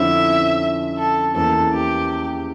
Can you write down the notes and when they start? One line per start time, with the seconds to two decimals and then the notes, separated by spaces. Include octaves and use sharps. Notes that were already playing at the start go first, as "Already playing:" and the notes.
Already playing: F2 D3 F3 C#4 E4 E5
0.97 A4
1.34 E2 E3 A#3 C#4 A4
1.73 G4